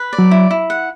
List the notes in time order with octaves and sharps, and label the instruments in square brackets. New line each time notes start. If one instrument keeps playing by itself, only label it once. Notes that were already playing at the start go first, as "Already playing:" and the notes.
Already playing: [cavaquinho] B4
D5
[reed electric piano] F#3
[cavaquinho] E4
E4
F#5